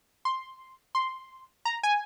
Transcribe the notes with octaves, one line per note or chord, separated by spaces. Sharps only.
C6
C6
A#5
G#5